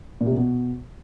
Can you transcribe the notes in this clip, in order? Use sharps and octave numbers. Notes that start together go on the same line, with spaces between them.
A#2
C3
A#2
B2